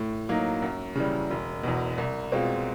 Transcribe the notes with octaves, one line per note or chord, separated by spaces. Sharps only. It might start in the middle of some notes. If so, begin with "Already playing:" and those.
Already playing: A2
F#3 A#3 D#4
F#2
C#3 E3 G3
E1
E2 B2
C2
B2 G#3 C4 F4